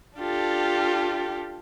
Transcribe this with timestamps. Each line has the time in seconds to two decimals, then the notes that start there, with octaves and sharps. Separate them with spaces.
0.18 D4 F4 G4 A4